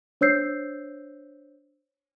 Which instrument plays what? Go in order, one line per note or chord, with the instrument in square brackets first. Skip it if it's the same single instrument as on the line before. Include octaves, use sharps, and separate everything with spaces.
[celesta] D4 C5 C#5 E6 G6 C7